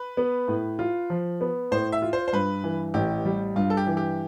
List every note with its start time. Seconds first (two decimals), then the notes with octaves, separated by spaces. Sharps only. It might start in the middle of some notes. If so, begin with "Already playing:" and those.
Already playing: B4
0.17 B3
0.48 A2
0.79 F4
1.10 F3
1.41 B3
1.71 A2 C5
1.92 E5
2.02 F4
2.13 C5
2.28 C5
2.33 G2 B4
2.64 E3
2.94 A1 G4
3.25 G3
3.56 G2 F4
3.70 A4
3.77 G4
3.87 E3
3.97 G4